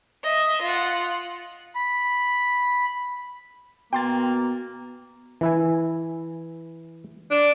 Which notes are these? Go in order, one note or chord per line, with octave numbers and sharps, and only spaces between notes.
D#5 E5
F4 F#5
B5
B2 A#3 G5 C6 A6
E3 E4 G#5
D4